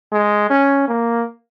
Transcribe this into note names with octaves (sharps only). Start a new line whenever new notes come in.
G#3
C#4
A#3